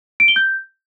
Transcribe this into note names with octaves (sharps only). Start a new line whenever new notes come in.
D7
G7
G6